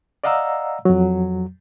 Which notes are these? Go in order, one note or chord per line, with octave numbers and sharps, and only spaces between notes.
D5 D#5 F5 F#5 A#5 E6
F2 F#3